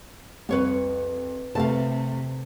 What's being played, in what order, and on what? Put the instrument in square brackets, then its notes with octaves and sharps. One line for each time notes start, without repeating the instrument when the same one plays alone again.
[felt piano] C2 F2 [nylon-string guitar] B4 C#5 F5
[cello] C3 [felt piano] A3 B4 [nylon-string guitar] F5 A5